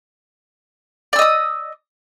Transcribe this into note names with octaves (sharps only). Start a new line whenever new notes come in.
D5 D#5 D#6 E6